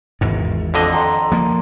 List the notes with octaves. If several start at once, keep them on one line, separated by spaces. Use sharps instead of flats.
G#1 E2 G#2
F2 D3 D#5
G5 A#5 C6
F3 A#3